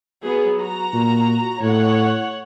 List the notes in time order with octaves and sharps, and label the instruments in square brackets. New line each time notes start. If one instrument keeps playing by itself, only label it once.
[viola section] F#3 B3 G#4
F#4 A#5
[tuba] A#2
[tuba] A2 [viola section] C#5 F#5